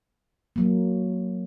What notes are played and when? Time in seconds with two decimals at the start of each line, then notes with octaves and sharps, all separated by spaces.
0.56 F#3 A#3